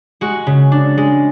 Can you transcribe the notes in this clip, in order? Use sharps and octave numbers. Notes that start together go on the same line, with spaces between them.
G#3 F#4
C#3
D4
G#3